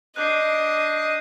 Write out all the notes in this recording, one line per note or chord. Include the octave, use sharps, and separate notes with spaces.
D4 D#5 F#6 G6 C7